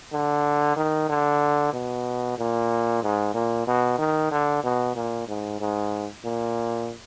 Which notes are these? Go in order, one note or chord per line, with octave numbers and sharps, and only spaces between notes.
D3
D#3
D3
B2
A#2
G#2
A#2
B2
D#3
D3
B2
A#2
G#2
G#2
A#2